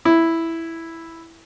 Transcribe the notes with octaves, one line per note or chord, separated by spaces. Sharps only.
E4